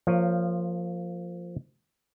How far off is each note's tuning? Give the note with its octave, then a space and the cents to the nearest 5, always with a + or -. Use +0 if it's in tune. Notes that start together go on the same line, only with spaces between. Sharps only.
F3 +0 A#3 -25 C#5 +0